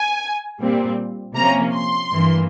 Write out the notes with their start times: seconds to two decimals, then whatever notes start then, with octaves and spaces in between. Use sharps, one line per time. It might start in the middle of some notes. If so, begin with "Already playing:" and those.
Already playing: G#5
0.61 A#2 G3 C4
1.36 C3 F3 A#3 C#4 A#5
1.74 C6
2.13 G2 E3 A#3